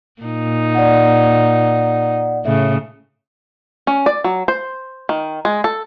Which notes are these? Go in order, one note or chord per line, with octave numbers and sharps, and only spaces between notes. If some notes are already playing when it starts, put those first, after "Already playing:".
A#2 D#4
D5 F#5
A2 C#3 E5
C#4
D5
F#3
C5
D#3
G#3
A4